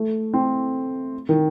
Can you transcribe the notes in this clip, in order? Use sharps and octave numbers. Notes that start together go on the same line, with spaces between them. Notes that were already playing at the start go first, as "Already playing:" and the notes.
Already playing: A3
C4
D#3